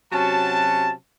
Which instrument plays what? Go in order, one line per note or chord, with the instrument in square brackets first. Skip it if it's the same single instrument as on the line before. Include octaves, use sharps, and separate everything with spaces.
[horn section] C3 F#3 C#4 F#4 A5